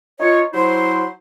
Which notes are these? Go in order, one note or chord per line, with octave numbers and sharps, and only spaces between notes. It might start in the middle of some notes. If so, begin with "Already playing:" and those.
D#4 F4 C#5
F#3 E4 C5